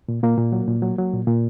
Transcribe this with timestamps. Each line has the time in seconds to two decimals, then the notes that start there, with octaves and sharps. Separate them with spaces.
0.08 A#2
0.23 A#2 A#3
0.38 A#2
0.52 F#3
0.68 A#2
0.82 F#3
0.98 F#3
1.13 A#2
1.27 A#2